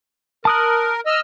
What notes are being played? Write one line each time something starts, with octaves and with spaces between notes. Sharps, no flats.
A#4 A5 D#6 F#6
D#5 E6 F6